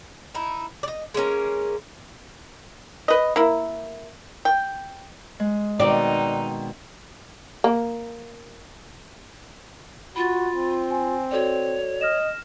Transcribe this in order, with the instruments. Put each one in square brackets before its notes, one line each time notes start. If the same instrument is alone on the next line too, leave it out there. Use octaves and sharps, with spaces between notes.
[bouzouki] D#4 E4
D5 D#5
G#3 A#3 C#4 A#4
[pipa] B4 D#5
A#3 E4
G5
[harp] G#3
[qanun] B2 D#3 C4 [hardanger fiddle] D#4 [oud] D5
[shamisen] A#3
[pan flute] F4 [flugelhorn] F#4 [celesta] B5 A6
[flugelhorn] C4
[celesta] G#5
[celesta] F#4 A4 D5 [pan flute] C#5
[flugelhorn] D#5 [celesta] F6 A#6 E7